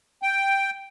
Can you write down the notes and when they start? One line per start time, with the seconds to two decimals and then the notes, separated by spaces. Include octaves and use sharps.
0.22 G5